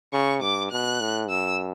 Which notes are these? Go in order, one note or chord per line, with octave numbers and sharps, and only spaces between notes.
C#3 C#6
G2 D6
B2 F#6
A2
F#2 E6